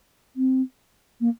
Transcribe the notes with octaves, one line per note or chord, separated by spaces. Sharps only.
C4
A#3